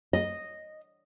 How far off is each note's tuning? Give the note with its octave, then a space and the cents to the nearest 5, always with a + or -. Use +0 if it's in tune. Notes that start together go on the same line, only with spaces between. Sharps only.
D#5 -5